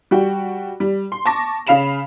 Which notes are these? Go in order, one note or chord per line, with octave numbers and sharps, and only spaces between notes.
G3 F#4 G5
G3
C6
A5 C#6 D6 A#6
C#3 F5 B5 E7 F7